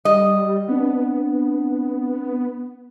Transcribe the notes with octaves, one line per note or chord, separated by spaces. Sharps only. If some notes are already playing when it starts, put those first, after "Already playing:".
G3 D#5
B3 C4 D4